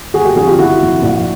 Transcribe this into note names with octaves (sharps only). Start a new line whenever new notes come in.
G1 F#4 G#4
G4 A4
F2 D3 F#4 G#4
F4 G4
G1 E4 F#4
F2 D3
A#1